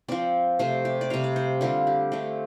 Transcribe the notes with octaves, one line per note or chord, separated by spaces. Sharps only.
F3 C4 D5
C3 A3 C4 C5
G4
D5
C3 G3 C4 F5
D5
C5
D3 G3 C4 F4
G4
D3 A3 C4 G4